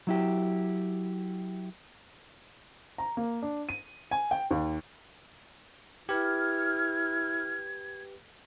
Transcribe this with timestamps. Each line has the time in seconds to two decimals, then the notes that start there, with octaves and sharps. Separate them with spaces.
0.07 F#3 E4 G4
2.98 A#5
3.17 A#3
3.42 D4
3.69 D#7
4.11 G#5
4.31 G5
4.51 D#2
6.09 E4 G4 B4 F6 G#6